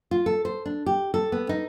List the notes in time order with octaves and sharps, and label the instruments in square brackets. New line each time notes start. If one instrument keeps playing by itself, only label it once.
[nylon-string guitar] F4
A4
C5
D4
G4
A4
B3
D#4